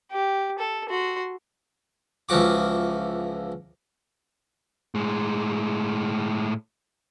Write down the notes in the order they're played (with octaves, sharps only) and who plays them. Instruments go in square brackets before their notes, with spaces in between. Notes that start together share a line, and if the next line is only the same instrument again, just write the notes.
[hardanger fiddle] G4
A4
F#4 C6
[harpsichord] C#2 E3 F3 F#4 D6
[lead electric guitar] A2 G#3